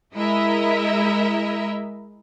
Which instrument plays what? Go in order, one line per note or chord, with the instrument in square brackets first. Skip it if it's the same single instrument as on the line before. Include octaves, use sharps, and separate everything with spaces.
[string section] G#3 E4 A#4 D#5 E5